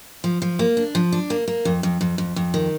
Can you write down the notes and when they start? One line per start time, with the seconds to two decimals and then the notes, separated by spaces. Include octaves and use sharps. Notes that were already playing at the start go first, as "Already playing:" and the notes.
0.24 F3
0.42 F3
0.59 A#3
0.77 D4
0.95 F3
1.12 D4
1.30 A#3
1.48 A#3
1.65 F2
1.83 F2
2.01 F2
2.18 F2
2.36 F2
2.54 D#3